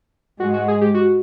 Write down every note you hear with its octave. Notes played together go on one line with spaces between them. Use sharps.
G#2 G#3 F#4
F#4
G#4
G4
F#4